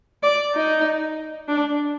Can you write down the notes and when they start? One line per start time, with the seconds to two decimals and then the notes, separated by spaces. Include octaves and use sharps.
0.23 D5
0.55 D#4
1.48 D4